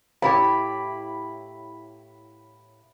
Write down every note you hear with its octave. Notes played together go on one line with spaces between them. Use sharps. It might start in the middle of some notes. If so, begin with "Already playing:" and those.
A2 E4 G4 B5